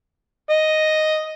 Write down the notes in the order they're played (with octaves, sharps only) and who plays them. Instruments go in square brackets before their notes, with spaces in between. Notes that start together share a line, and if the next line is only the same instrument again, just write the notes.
[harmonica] D#5